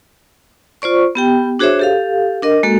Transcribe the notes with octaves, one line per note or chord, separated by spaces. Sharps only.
F4 C5 D5 C#6
B3 G4 G5
D4 F#4 G#4 C5 C#5 E5
G4 A4 F5
D4 A#4 D#5
G#3 A#3 F#4 A4